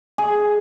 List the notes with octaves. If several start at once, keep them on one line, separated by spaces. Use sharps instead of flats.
G#4